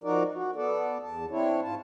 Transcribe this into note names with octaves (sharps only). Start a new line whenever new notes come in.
F3 D#4 F#4 A#4 D5
F#4
B3 A4 D5
E2 A5
C4 D4 E4 C#5
G#2 F4 A5